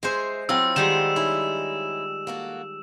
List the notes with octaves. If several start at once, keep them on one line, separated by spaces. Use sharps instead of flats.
G#3 G#4 C5 E5 G#5
F#3 C4 E4 F4 E6
D#3 G3 G#3 F#4 G4 C5 E7
C#4 D#4 E4
A#3 F#4 A4